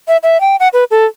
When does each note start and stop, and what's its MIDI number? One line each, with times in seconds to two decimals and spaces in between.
0.08 0.17 76
0.23 0.40 76
0.41 0.56 79
0.60 0.68 78
0.73 0.84 71
0.91 1.05 69